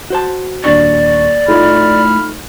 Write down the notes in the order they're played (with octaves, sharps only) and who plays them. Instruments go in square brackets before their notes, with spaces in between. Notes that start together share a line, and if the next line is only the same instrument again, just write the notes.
[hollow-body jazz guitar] F#4 C5 A5
[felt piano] D#1 D4 C#6 [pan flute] D5
[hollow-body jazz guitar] A2 [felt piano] A3 D#4 F4 [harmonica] B5 F6